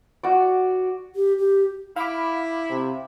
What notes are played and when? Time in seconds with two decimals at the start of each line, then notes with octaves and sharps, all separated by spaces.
0.23 F#4 D5
1.16 G4
1.38 G4
1.96 E4 F5 B5 D6
2.70 C3